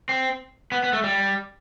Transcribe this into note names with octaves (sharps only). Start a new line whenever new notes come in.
C4
B3
B3
A3
G3